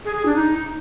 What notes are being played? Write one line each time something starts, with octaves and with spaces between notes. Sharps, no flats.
G#4
G#4
D4
D#4